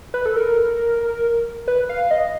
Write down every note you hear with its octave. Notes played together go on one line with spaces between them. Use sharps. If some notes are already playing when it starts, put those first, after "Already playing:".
B4
A4
A#4
B4
F5
D#5